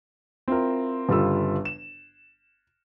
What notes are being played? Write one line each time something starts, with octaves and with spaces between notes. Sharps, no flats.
C4 E4 F4 A#4
G1 C#3 G3 F4 A4 E6
E7